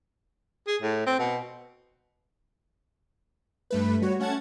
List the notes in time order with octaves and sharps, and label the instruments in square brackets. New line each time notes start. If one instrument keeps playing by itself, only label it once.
[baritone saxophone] G#4
A2
C4
B2
[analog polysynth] G2 A3 B4
G3 F#4 C#5
A3 C#4 F#5 A5 G#6